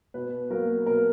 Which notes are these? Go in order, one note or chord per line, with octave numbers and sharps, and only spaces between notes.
B2 B4
F#3 A#3 A#4
B2 A#4